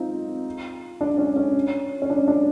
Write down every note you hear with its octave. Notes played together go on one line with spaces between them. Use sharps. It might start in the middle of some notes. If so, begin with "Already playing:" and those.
Already playing: C4 D#4 F4
D4
C#4
C#4
C#4
D4
D4